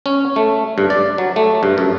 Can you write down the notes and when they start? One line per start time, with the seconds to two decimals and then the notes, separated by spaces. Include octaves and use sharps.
0.06 C#4
0.36 A3
0.78 G2
0.90 D5
1.18 F#3
1.36 A3
1.63 G2
1.78 F#2